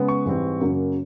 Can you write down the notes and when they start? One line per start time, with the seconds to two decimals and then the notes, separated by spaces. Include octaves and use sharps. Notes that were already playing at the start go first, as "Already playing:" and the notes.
Already playing: C#3 G#3 B3
0.08 C#6
0.26 G#2 E3 G3 C4
0.60 F#2 C#3 F#3 A#3